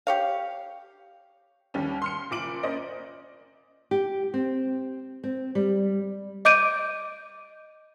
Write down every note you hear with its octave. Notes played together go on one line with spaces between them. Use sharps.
G4 C#5 F5
D#2 G3 C#4
C6 F6 C#7
F#1 A#2 D6 D7 F#7
A#3 C#4 C5 D5 D#5
G4
C4
C4
G3
D#5 D6 G6 D7 D#7